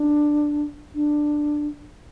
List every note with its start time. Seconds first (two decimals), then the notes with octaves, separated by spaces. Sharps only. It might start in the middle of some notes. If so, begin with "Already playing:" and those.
Already playing: D4
0.94 D4